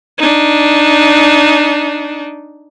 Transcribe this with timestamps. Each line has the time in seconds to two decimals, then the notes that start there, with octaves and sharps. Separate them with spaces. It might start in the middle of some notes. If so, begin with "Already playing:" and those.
0.18 D4 D#4